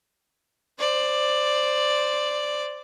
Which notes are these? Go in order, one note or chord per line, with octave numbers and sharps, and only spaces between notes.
C5 D5